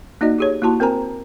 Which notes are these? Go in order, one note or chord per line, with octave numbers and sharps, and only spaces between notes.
A#3 D#4 F#4 D5 D#5
G4 G#4 C#5
A#3 E4 F#4 A5 C6
C4 A#4 C5 G#5 A#5